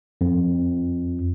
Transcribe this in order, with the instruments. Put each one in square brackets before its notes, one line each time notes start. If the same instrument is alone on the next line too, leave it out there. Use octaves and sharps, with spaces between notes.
[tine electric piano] F2